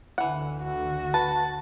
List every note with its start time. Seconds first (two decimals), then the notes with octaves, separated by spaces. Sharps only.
0.18 D2 D3 E3 F#5
0.62 F#4
1.14 B4 A5